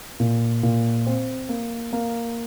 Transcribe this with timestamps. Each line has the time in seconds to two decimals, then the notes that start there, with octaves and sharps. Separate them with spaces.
0.20 A#2
0.63 A#2
1.06 C4
1.49 A#3
1.93 A#3